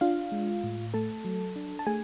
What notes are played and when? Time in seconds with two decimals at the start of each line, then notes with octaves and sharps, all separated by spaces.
0.01 D4 F4 F5
0.32 G#3
0.64 A2
0.94 A3 A4 A5
1.25 F#3
1.56 D4
1.79 A5
1.87 A3 G#4 G#5